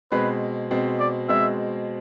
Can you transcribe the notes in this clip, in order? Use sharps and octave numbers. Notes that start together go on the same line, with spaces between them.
B2 G#3 C4 B4
B2 G#3 C4
D5
B2 G#3 C4 E5